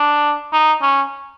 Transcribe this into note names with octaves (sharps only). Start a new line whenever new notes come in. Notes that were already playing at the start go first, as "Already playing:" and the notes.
Already playing: D4
D#4
C#4